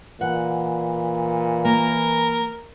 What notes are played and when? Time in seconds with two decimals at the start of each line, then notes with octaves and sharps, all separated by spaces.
0.21 A#2 E3 F#5
1.65 A#3 A#4